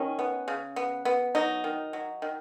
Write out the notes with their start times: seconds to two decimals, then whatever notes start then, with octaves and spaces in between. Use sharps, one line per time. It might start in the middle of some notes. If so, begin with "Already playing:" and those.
Already playing: D#3 C#4
0.19 B3
0.48 C#3
0.76 B3
1.05 B3
1.35 F#3 D#4
1.64 D#3
1.93 F#3
2.22 D#3